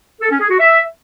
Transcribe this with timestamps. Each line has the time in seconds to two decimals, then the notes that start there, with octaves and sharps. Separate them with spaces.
0.21 A4
0.31 C#4
0.40 G#4
0.50 F#4
0.60 E5